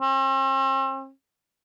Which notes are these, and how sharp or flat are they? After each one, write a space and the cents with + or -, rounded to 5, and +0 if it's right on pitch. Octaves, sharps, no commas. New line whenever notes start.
C4 +45